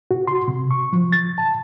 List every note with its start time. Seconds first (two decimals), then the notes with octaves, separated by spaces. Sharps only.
0.11 F#4
0.27 C6
0.48 C3
0.71 C#6
0.93 F3
1.12 A6
1.38 A5